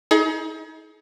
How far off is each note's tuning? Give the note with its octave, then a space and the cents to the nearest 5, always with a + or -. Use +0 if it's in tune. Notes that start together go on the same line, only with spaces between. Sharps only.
D#4 +40 G#4 +35